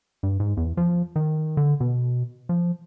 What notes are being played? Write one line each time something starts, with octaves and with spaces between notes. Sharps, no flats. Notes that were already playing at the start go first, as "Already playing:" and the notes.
G2
G#2
E2
F3
D#3
D3
B2
F3